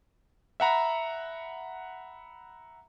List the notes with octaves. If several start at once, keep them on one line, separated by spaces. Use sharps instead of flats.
E5 F#5 A#5 B5